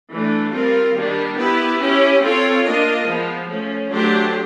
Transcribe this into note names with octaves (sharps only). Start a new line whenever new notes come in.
E3 A3 D4
G3 C4 F4 A#4
D#3 G3 A#3 D4 G4
B3 E4 G4 B4
C#4 E4 G4
C4 F4 A4 C#5
A#3 D4 F4 A#4 D#5
F3 G#3 B3
F3 A3 C#4
F#3 A3 D4 G4 C5